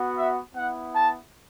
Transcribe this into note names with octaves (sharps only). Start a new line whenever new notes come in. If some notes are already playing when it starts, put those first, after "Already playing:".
Already playing: B3 F#4
E5
B3 E4 F#5
A5